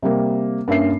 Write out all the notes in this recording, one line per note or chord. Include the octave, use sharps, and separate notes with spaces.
C3 G3 A#3
G2 A#3 C#4 E5 C7